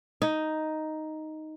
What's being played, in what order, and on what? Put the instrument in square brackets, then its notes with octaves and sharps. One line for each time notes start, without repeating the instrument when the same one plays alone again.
[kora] D#4